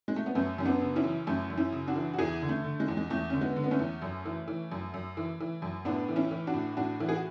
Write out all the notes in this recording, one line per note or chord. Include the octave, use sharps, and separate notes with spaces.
G#3
A3
B3
F#2 A3 C#4
F#2 C#4
B3 D4
C#3
C#4 E4
E3
F#2 A3 C#4
F#2
C#4 E4
C#3
D4 F#4
E3
F#4
E2 E4 G#4
D3
A3
D3
G#3
E2
G#3
E2 A3
D3 C#4
G#3 B3
D3
B3
A3 C#4
E2
F#2
E3
E3
F#2
F#2
E3
E3
F#2
A2 B3 D4
E3
C#4 E4
E3
D4 F#4
A2
A2 D4 F#4
E3
G#4
F#4